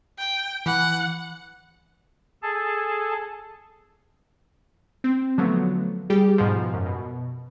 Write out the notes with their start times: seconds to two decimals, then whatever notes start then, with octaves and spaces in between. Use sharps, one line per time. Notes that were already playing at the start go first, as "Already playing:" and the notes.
0.18 G5
0.66 E3 F#5
2.43 G#4 A4 A5
5.04 C4
5.38 D3 F3 F#3 A3 B3
6.10 G3 G4 G#4
6.38 G#2 B2 F3
6.74 F#2
6.86 B2